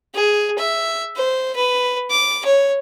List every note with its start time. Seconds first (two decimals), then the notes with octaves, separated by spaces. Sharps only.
0.15 G#4
0.58 E5
1.16 C5
1.56 B4
2.10 D6
2.45 C#5